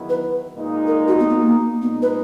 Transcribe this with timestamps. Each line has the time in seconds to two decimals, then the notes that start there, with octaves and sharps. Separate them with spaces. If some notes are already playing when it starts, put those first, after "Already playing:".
Already playing: E2 D#3 F#3 B3 E4
0.09 B4
0.56 A#2 G#3 D#4
0.87 A#4
1.08 F#4
1.19 B3
1.30 B3
1.41 A#3
1.82 A#1 A#2 G#3 B3 D#4
2.02 B4